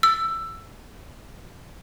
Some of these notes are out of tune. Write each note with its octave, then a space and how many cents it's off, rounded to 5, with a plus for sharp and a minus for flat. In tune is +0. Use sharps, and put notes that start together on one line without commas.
E6 +15